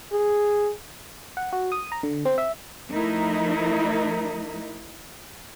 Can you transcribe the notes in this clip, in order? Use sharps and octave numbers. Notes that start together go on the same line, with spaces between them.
G#4
F#5
F#4
D#6
A#5
D3
C4
E5
F3 A3 D#4 E4 A#4 D#5